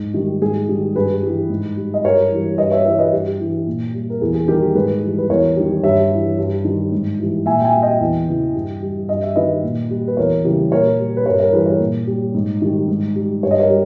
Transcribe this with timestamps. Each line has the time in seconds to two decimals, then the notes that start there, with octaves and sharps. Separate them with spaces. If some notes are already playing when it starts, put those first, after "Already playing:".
Already playing: G#2
0.14 D#3 G3
0.42 G#2 G#4
0.69 D#3 G3
0.96 G2 G#4 B4
1.23 E3 G3
1.50 G#2
1.77 G3
1.94 D#5
2.04 G2 A#4 C#5
2.31 E3 G3
2.58 G2 B4 D#5
2.72 C#5 E5
2.85 E3 G3 C#5 E5
2.99 B4 D#5
3.12 G2 G4
3.40 E3 G3
3.67 A#2
3.94 G3
4.10 A#4
4.21 E2 G#4
4.35 G#4
4.48 D#3 G3 G4 A#4
4.75 G#2 G#4 B4
5.02 E3 G3
5.18 B4
5.29 E2 A#4 C#5
5.56 D#3 G3
5.83 G2 C#5 E5
6.11 E3 G3
6.38 G2
6.65 D#3 G3
6.92 G#2
7.19 E3 G3
7.46 A#2 E5 G#5
7.60 G5
7.65 E5 G#5
7.73 G3
7.82 D#5 G5
8.01 E2
8.28 C#3 E3
8.54 G2
8.82 G3
9.09 G2 D#5
9.23 E5
9.36 D#3 G3 B4 D#5
9.63 A#2
9.90 G3
10.08 B4
10.17 E2 A#4 C#5
10.44 C#3 E3 G3
10.72 A#2 A#4 C#5
10.99 G3
11.17 B4
11.26 G2 A#4 C#5
11.40 A#4 C#5
11.52 E3 G3 G#4 B4
11.66 A#4 C#5
11.80 A#2
12.07 G3
12.35 G#2
12.62 D#3 G3
12.88 G#2
13.16 G3
13.43 G2 C#5
13.51 D#5
13.59 A#4 C#5
13.70 G3